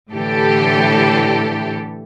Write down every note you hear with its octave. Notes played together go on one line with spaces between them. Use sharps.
A2 D3 E3 G4 A4